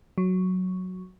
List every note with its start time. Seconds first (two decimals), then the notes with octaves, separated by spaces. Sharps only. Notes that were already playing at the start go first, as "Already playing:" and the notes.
0.18 F#3